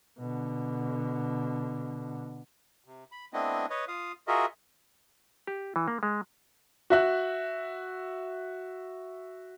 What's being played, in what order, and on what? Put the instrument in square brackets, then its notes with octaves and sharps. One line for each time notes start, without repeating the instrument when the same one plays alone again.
[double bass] B2 D3
[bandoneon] C3
B5
A3 B3 C4 D4 E4 D#5
B4 C#5 D#5
F4 F5 D#6
F4 F#4 G#4 A#4 D#5 E5
[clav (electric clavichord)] G4
E3
A#3
G#3
[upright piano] F#4 E5 F#6